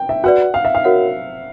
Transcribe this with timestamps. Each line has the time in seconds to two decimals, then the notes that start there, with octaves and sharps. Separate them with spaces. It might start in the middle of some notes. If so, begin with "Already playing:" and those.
Already playing: G5
0.09 E5
0.24 F#4 B4 D5 F#5
0.54 F5
0.65 E5
0.75 F5
0.84 F#4 A#4 C#5 F#5